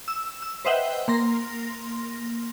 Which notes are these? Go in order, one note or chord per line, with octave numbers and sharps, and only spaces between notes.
E6
E6
B4 C5 D#5 E5 F#5 G5
A#3 C6 A#6